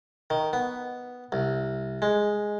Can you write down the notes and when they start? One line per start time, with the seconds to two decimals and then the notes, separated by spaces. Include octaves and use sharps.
0.30 D#3
0.53 B3
1.32 C2
2.02 G#3